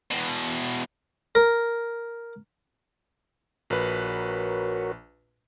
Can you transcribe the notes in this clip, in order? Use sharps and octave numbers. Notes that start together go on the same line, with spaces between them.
E2 B2
A#4
A#1 F#4 A#4 B4 C#5